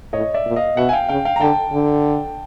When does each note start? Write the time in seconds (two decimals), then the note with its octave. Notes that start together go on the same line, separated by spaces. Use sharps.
0.13 A2 C#5 D#5
0.34 D5 E5
0.45 A#2
0.56 D#5 F5
0.77 B2 E5 F#5
0.89 G#5
0.93 F5 G5
1.09 C#3 F5 G5
1.25 F5 G5
1.36 A#5
1.40 D3 G5 A5
1.73 D3